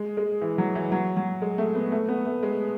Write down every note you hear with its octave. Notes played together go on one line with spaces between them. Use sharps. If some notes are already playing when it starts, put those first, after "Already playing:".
Already playing: G#3
G#3
E3
F#3
E3
F#3
F#3
G#3
A3
B3
A3
B3
A3
G#3